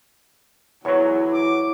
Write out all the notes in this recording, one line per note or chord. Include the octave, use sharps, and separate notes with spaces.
E2 F#3 E4 C#5
D6